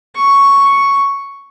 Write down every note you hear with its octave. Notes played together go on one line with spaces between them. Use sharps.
C#6